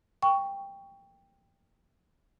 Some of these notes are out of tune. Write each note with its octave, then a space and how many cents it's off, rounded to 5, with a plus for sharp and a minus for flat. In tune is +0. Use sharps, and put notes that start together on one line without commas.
G5 +15 C#6 +10